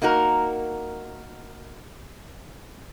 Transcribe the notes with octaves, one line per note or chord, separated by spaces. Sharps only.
A#3 D#4 F#4 A#4